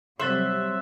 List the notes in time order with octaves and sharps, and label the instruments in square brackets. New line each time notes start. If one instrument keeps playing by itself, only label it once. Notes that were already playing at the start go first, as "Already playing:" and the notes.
[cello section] C3 F#3 G3 [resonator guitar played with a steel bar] C5 [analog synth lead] E5 [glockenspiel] C6 F#6 A6